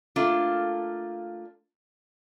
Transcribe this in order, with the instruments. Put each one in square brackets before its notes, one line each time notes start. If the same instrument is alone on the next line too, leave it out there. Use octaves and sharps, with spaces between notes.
[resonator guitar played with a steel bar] A3 A#3 D4 F4